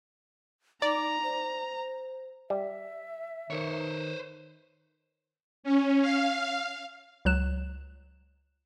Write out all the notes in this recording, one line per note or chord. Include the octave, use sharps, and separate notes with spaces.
D#4 D5 A#5
C5
G3 E5
D#3 C5 C#5
C#4
F5
C#2 F#3 F#6 E7